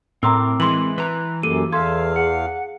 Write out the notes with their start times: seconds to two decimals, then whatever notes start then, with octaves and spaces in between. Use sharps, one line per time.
0.23 A2 C4 A#4 A#5 C6 D6 E6
0.60 E3 G#3 C6 F#7
0.98 E3 B4 A#5 F#6
1.43 F#2 A#3 G4 A4 D#7
1.72 E2 A4 B4 E5 F5 C6 G#6
2.16 G#4 F#5